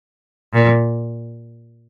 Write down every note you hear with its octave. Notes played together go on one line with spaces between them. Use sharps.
A#2